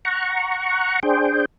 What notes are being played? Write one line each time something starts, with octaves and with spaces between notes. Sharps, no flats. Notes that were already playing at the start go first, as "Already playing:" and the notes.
F#5 A#5 C#6
D4 G#4 C5 G5